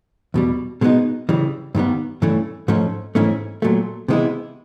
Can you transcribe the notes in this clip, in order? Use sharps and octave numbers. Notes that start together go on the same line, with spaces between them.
E2 B2 G3
B2 G#3 B3 D#4
C#3 E3 G3
G2 D#3 G3 B3
G2 E3 A3 C#4
G#2 F3 A3 C#4
G#2 E3 A3 C#4 E4
A#2 F#3 A3
C3 E3 G#3 B3 E4